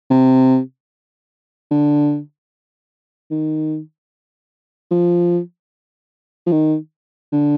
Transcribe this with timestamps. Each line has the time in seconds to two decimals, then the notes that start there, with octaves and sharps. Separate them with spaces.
0.10 C3
1.71 D3
3.31 D#3
4.91 F3
6.46 F3
6.52 D#3
7.32 D3